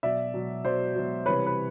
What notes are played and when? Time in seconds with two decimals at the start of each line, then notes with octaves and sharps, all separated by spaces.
0.03 B2 F#3 D5 E5
0.34 B2 F#3
0.65 B2 F#3 C5 D5
0.95 B2 F#3
1.26 C3 E3 G3 B4 C#5
1.46 B4